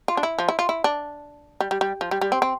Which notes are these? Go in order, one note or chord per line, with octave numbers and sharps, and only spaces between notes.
F4
D4
E4
F3
E4
F4
E4
D4
G3
G3
G3
F3
G3
G3
C4
C4